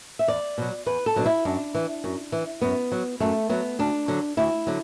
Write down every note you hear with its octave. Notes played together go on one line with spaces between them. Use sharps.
E5
E2 D5
B2 F#3
E2 B4
A4
B2 F#3 D4
E4
F#2 D4
E3
F#2
E3
F#2 B3
F#3
F#2 A3
F#3 B3
D2 D4
D3 F#3
D2 E4
D3 F#3